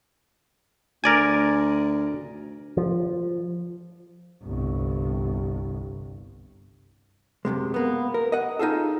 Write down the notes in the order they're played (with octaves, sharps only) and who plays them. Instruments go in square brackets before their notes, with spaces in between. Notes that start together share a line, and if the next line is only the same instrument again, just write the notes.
[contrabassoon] D2 [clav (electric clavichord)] A#4 D5 G#5
[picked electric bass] F3
[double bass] G1 C2
[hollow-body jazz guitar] F#2 A2 C3 G#3
A#3 B3
A#4
D#5 F#5
D#4 F4 G#4 A4